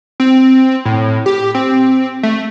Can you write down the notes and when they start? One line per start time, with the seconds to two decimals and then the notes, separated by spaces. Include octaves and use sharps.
0.20 C4
0.85 A2
1.26 G4
1.55 C4
2.23 A3